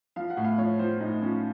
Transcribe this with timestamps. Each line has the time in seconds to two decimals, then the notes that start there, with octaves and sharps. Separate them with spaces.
0.16 F3 F5
0.30 F#5
0.37 A2
0.44 F5
0.58 F3 C#5
0.79 F3 C5
1.00 A2 D#4
1.22 F3 C#4